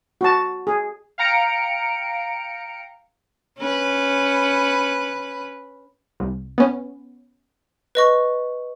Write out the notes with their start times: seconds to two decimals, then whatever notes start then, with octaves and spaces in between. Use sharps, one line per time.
0.21 F#4 A5
0.67 G#4
1.18 F5 G5 A#5 C#7 D7
3.58 C#4 B4
6.20 C2
6.58 B3 C#4
7.95 B4 D#5 C#6